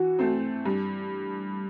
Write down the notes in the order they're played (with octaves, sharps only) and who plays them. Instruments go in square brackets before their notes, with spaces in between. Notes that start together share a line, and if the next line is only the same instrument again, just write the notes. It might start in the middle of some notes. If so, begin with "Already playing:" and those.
Already playing: [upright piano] E3 [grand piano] F#4
[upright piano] A3 C4
G2